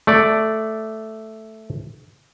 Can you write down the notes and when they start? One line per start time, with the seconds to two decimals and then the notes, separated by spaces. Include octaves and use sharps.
0.07 A3 D5